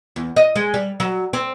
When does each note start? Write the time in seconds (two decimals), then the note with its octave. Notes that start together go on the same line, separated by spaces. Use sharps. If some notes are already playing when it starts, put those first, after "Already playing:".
0.16 E2
0.36 D#5
0.56 G#3
0.74 G3
1.00 F#3
1.33 C4